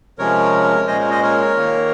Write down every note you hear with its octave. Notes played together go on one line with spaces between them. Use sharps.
C3 F3 G#3 C#4 A#4 C#5
A#2 G#3 C#4 C5 D#5
A#4 C#5
C5 D#5
A#4 C#5
D#3 A#3 D#4